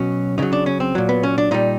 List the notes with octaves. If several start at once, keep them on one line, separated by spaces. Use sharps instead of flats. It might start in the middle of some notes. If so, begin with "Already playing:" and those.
Already playing: B2 F#3 C#4
C#3 F#3 D#4
D4
C#4
C4
A#2 F#3
B3
C#4
D4
A#2 G3 D#4